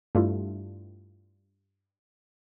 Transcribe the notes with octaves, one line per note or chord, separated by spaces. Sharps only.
G2 A3 E4 F4